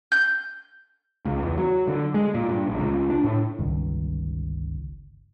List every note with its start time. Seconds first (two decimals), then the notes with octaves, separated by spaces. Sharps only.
0.12 G6
1.25 C#2
1.43 E2
1.58 F#3
1.87 D3
2.14 G#3
2.34 A#2
2.49 G2
2.67 A#1
2.79 C#2
3.10 D4
3.24 A2
3.58 G1 C#2 D#3